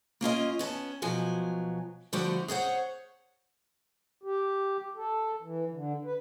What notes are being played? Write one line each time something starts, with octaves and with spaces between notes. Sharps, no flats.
A#3 C#4 F4 D#5
B3 C#4 E5 A5
B2 F3 F#3 G#5
D3 F3 G3 A3 F#4 G4
G#4 C5 C#5 F#5
G4
A4
E3
D3
B4